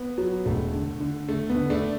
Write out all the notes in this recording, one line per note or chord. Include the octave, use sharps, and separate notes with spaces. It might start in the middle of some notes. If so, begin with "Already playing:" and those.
Already playing: B3
F#3
E1 A3
D3
D3
D3 A3
B3
D3
A3 D4